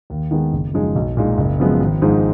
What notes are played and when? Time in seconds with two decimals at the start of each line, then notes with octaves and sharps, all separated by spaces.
0.10 D#2
0.31 D#3 G#3 B3
0.53 F#1
0.74 F#2 F3 G#3 D#4
0.95 B1
1.17 A#2 G#3 D#4
1.38 F#1
1.60 F#2 F3 G#3 B3
1.80 G#1
2.02 G#2 F3 G#3 D#4